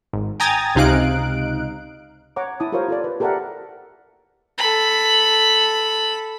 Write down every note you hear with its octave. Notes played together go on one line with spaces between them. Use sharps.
G#1
G5 G#5 A#5 D#6 G#6 A6
C#2 C3 D#4 F5 F#6 D7
C#5 F#5 A#5 D6
E4 A5 D6 D#6
F4 G4 A#4 C5 C#5 F5
F4 A4 D5
B4
G4 A4 A#4 D5 E5 F#5
A4 B5